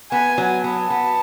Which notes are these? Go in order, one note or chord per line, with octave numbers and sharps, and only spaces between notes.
B3 G#5
F#3
B3 A5
B3